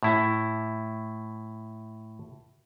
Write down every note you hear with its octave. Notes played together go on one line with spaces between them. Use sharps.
A2 E4